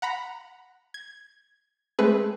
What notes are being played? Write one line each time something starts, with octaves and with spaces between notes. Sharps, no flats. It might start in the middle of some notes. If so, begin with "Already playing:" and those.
F#5 A#5 B5
G#6
G#3 A3 C4 G#4 B4